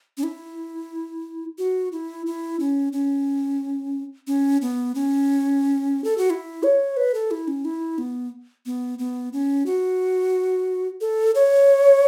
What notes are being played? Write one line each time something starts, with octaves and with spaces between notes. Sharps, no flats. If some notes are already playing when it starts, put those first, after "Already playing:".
C#4
E4
F#4
E4
E4
C#4
C#4
C#4
B3
C#4
A4
F#4
E4
C#5
B4
A4
E4
C#4
E4
B3
B3
B3
C#4
F#4
A4
C#5